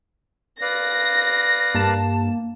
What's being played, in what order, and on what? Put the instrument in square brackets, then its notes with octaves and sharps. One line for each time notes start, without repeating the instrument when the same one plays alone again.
[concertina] B4 D5 F5 [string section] A#6
[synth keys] G2 A5 E7 [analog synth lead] A#3